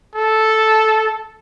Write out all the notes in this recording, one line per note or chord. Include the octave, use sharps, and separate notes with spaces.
A4